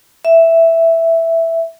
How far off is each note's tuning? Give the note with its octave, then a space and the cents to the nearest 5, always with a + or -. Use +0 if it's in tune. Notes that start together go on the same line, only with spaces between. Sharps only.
E5 +0